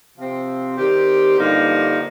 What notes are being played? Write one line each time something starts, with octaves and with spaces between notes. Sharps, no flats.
C3 F3 C4
D#3 G3 C4 G4
G2 D3 F3 A#3 D#4